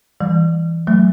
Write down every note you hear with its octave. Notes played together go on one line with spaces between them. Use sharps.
E3 G3
F#3 A3